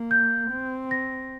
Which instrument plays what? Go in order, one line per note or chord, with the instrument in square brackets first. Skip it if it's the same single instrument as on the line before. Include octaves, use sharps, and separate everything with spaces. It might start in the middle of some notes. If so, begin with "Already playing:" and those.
Already playing: [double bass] A#3
[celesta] G6
[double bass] C4
[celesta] A#6